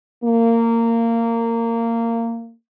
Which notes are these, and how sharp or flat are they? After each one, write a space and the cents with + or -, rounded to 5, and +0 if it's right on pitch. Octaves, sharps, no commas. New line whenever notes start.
A#3 -20